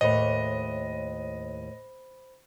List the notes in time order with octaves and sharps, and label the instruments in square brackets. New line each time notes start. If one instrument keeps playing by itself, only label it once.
[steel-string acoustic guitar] D#2 A2 [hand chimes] C5 B5 [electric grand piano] D#5